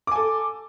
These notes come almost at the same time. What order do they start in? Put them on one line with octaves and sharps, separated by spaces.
D6 G#5 A4